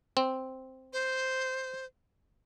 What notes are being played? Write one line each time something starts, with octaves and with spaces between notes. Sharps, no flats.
C4
C5